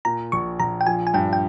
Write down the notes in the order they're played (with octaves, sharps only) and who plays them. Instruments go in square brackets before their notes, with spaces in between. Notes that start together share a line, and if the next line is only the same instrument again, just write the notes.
[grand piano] A#2 [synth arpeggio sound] A#5
[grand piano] A#1 [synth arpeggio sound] C#6
[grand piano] A#1 [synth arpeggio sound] A#5
[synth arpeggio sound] G5
[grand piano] F3 [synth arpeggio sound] G#5
[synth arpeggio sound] G#5
[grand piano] G2 [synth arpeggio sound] G5
[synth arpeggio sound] G5